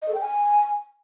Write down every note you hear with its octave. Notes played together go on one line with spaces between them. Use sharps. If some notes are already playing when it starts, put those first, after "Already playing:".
D#5
A4
G5
G#5